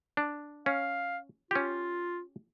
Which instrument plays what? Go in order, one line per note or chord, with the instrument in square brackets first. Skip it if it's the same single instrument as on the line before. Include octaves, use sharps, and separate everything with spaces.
[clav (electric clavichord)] D4
[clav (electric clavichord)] C#4 [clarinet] F5
[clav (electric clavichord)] C#4 G4 [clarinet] F4